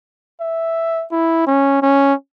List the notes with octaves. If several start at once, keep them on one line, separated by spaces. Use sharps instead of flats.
E5
E4
C#4
C#4